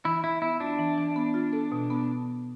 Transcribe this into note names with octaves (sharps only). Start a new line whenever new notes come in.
E3 E4
E3 E4
B3 E4
D4 F4
E3
E3
B3
F4
A4
B2
B3